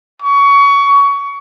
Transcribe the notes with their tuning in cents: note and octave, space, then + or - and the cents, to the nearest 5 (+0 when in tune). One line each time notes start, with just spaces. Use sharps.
C#6 +25